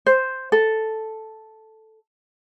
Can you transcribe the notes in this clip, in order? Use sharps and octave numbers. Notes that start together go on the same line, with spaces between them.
C5
A4